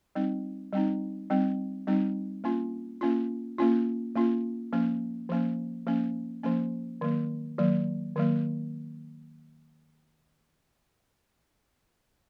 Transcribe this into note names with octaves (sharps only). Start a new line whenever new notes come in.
G3 C4 D#4
G3 C4 D#4
G3 C4 D#4
G3 C4 D#4
A#3 C#4 F4
A#3 C#4 F4
A#3 C#4 F4
A#3 C#4 F4
F3 A#3 C#4
F3 A#3 C#4
F3 A#3 C#4
F3 A#3 C#4
D#3 F#3 A#3
D#3 F#3 A#3
D#3 F#3 A#3